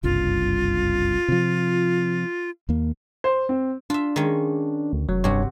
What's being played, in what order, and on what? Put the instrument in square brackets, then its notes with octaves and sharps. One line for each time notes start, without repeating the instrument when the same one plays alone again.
[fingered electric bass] F#1 C2 G2 [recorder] F4
[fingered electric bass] C3 F3
D#2 A#3
[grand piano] C5
C4
[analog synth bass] D4 [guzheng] F4 E5
[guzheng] D#3 G#3 C#4
[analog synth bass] D2
[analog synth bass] F1 [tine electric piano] F#3
[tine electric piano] G2 C#5 [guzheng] C3 F#4